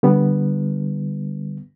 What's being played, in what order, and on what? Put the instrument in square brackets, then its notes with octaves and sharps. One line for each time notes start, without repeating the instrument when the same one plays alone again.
[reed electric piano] D3 G3 B3